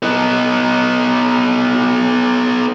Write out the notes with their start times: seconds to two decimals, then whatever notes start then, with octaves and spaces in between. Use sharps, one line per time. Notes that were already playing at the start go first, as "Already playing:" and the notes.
0.03 B3 D#4